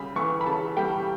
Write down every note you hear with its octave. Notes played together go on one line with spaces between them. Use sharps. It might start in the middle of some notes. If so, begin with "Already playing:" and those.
Already playing: C#3 G3 B5
E3 C#6
B5
C#3 A5
G3 G5